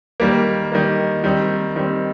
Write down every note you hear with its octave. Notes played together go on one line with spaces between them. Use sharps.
D#3 G3 A#3
D#3 G3 A#3
D#3 G3 C4
D#3 G3 C4